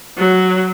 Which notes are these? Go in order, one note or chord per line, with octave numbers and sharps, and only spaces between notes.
F#3